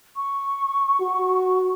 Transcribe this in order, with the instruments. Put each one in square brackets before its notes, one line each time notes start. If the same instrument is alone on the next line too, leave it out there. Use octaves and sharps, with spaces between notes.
[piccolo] C#6
[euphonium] F#4